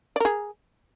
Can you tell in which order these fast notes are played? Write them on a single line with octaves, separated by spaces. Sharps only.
D5 A#4 G#4